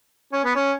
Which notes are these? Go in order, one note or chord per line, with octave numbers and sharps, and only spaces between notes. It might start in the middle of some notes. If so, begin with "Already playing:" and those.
C#4
B3
C#4